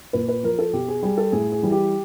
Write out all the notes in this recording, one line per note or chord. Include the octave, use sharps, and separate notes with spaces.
A#2 B4
B4
F3 A#4
A4
B2 G4
G#4
G3 G#4
A4
A2 G#4
G#4
E3 G3
G4